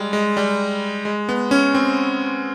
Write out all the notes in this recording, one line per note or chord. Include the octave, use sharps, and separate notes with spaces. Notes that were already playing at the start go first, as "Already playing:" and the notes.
Already playing: G3 G#3
G#3
G3
G#3
B3
C#4
C4